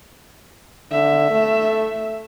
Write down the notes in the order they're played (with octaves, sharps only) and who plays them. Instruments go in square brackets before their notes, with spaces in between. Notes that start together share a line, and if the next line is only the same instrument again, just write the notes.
[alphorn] D3 [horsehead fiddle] E5
[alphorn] A3